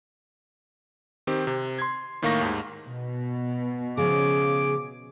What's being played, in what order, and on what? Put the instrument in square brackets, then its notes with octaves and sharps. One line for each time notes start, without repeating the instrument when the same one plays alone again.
[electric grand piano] D#3 C4 G4
C3
C6 G#6
A2 D#3 A#3 F5 C#6 A#6
D#2 G#2
[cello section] B2
[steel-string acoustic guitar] C#3 F3 C#4 [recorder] G#4 [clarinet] D6